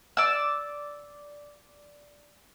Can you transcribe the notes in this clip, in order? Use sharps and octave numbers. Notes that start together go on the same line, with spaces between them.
D5 E6